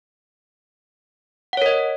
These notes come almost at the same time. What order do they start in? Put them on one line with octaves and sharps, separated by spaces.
F#5 C#5 A#4 D#5